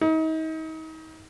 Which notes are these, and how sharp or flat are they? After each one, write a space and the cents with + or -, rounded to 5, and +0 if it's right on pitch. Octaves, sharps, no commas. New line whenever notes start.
D#4 +35